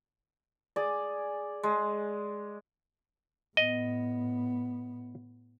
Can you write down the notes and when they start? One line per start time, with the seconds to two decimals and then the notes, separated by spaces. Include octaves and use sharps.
0.76 G#4 D5
1.63 G#3
3.57 A2 B3 D#5